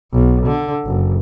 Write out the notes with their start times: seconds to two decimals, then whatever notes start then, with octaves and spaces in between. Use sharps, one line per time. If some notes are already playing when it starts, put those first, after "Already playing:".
0.13 B1
0.46 D3
0.86 F#1